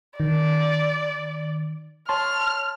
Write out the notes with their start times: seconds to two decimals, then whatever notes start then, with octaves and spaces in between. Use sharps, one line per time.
0.20 D#3 D5
2.09 C#5 A5 C6 F6